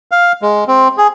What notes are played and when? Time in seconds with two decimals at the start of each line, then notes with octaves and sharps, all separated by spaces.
0.11 F5
0.42 G#3
0.68 C4
0.98 G#4